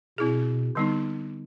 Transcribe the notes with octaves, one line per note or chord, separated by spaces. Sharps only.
B2 C4 E4 G#4
D3 G3 B3 D#4